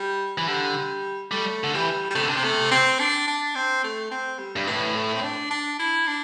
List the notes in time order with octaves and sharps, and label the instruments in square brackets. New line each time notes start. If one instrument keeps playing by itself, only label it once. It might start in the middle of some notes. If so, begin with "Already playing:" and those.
Already playing: [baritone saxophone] G3
[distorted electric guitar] E3
[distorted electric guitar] D3 [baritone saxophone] G3
[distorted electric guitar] G3 [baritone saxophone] A3
[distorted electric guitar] D3
[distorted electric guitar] E3 [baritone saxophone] G3
[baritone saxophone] G3
[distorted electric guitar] C3 [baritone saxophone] A3
[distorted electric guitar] D3
[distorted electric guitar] C3 [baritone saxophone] D4
[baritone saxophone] C4
A3
C4
D4
D4
C4
A3
C4
G3
[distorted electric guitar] G2
[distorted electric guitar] A2 [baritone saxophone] E3
[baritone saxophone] A3
C4
D4
D4
E4
D4